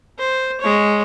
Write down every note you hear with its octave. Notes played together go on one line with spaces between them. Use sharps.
C5
G#3 C#5